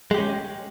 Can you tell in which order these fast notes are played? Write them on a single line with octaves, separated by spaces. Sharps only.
G#3 G4 C#4